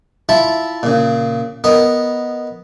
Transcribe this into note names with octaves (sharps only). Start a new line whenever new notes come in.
E4 F4 E5 A5
A#2 C#3
B3 A#4 D#5